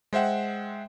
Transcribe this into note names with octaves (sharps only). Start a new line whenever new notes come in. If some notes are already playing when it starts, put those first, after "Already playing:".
G#3 C5 E5 F#5 G5